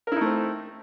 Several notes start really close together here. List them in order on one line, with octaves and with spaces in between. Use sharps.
A#4 E4 D#4 A3 C4